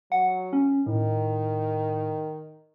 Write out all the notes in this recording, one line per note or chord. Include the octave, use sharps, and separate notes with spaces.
F#3 F#5
C#4
A2 D#3